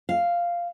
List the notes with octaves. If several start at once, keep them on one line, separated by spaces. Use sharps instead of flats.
F5